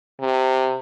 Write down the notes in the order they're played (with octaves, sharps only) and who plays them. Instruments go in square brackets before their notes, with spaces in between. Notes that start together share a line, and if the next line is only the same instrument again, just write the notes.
[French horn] C3